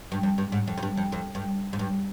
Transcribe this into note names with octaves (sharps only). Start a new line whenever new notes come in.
G2
F2
G2
G#2
F2
F2
G2
F2
F2
G2
G#2
G2